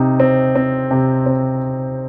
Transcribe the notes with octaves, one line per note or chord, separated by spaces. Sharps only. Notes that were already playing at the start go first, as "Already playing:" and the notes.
Already playing: C3 D#4
C4
C4
C3
C4